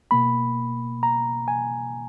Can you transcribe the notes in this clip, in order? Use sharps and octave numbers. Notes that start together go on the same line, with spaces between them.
B2 A#3 B5
A#5
G#5